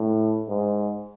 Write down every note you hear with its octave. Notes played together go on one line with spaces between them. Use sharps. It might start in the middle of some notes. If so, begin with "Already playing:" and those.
Already playing: A2
G#2